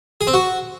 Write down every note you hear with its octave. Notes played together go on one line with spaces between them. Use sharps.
G#4
C4
F#4